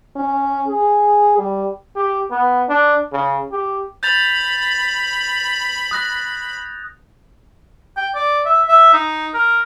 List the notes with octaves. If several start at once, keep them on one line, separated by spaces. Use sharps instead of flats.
C#4
G#4
G3
G4
B3
D4
C#3
G4
B5 G6 A6 F7
D#6 F#6 A#6
G5
D5
E5
E5
D#4
A#4